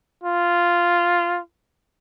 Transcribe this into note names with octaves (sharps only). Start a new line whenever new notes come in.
F4